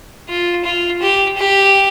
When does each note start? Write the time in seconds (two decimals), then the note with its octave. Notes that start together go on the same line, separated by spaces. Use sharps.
0.29 F4
0.64 F4
1.01 G4
1.37 G4